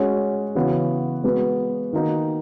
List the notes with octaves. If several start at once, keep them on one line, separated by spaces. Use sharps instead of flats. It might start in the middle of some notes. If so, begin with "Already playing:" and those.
Already playing: G#3 C#4 F#4 C#5
C#3 E3 B3 F#4 C#5
G#3 B3 F#4 B4
D#3 A#3 D#4 F#4 A#4